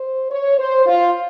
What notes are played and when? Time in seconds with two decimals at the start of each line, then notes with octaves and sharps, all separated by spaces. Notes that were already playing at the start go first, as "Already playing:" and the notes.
Already playing: C5
0.30 C#5
0.58 C5
0.86 F4